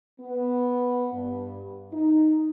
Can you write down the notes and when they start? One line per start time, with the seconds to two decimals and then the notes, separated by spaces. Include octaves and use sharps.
0.21 B3
1.13 G2
1.93 D#4